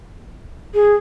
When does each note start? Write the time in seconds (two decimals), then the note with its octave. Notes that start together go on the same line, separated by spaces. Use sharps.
0.74 G#4